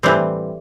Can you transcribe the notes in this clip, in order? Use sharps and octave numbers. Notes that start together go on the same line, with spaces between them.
A2 E3 G3 C4